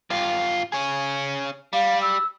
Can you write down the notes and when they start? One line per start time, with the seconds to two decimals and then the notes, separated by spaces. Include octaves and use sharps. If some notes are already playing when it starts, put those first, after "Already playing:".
0.10 G2 F4
0.72 C#4 G#4
1.73 G3 F5
2.01 E6